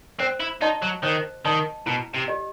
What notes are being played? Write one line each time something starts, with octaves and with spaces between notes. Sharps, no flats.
C4 C5
E4
D#4 D#5 A5 C6
F#3
D#3 C5
D#3 D#5 A5 C6
B2 E4
C3
G4 D#5